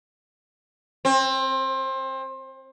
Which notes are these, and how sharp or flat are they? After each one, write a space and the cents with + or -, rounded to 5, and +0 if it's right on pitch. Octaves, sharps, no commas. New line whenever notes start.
C4 +25